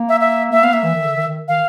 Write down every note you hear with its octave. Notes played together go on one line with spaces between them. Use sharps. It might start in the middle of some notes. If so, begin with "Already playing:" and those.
Already playing: A#3
E5
E5
A#3 E5
B3 F5
A#3 E5
E3
D#3
D3
D#3
D#3
D#3 F5